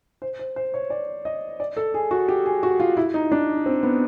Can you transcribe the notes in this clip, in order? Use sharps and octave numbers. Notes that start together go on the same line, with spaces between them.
C5
C5
C5
C#5
D5
D#5
D5
A4
G#4
F#4
G4
G#4
F#4
F4
E4
D#4
D4
C4
B3